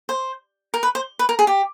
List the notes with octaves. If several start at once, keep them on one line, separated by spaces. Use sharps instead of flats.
C5
A#4
B4
C5
B4
A#4
G#4
G4